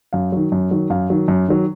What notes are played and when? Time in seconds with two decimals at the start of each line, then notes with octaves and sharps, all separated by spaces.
0.13 F#2 F5
0.32 D#3 F#3
0.52 F#2
0.71 D#3 F#3
0.90 F#2 F5
1.10 D#3 F#3
1.28 F#2
1.48 D#3 F#3